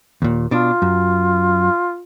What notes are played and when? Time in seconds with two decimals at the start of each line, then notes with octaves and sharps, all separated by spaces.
0.22 D#2 A#2
0.51 B2 D4 F4
0.82 F#2